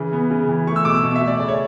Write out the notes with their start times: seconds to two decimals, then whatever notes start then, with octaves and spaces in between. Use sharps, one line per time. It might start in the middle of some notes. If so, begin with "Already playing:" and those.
Already playing: C#3 E3
0.13 B3
0.31 C#3
0.49 E3
0.67 A3 C#6
0.76 E6
0.85 B2 D6
0.94 E6
1.03 B2 C#6
1.16 E5
1.22 A3
1.27 D5
1.40 C#3 D5
1.48 C#5